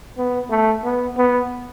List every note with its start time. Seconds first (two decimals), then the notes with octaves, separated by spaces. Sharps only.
0.17 B3
0.50 A3
0.83 B3
1.17 B3